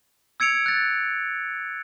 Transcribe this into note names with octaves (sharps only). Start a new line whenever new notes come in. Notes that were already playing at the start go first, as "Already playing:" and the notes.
E6 G#6 C#7 D7 F7
F#6 A6